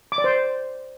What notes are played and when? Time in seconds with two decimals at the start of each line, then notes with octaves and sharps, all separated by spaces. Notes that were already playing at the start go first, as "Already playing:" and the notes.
0.12 D6
0.18 D5
0.24 C5